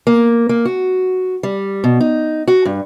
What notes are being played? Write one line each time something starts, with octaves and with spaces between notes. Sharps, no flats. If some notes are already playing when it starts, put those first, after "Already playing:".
A#3
A#3
F#4
G3
B2
D#4
F#4
G2